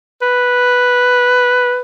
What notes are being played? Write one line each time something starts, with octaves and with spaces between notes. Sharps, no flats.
B4